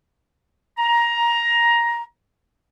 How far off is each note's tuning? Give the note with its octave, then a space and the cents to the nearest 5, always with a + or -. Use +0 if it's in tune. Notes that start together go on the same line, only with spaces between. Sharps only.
A#5 +15